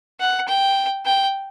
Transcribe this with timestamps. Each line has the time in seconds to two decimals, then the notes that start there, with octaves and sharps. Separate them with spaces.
0.20 F#5
0.48 G5
1.05 G5